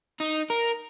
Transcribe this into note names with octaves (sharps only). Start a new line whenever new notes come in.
D#4
A#4